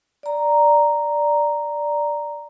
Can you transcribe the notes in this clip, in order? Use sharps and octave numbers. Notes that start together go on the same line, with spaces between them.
D5 A#5